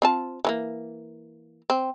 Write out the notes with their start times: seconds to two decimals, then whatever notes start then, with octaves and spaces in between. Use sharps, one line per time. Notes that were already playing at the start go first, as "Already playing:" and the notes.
0.02 C4 F4 A5
0.45 E3 F3 A#3
1.70 C4